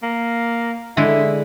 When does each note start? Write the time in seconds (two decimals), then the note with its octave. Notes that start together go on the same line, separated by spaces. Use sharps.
0.03 A#3
0.97 D3 G#3 E4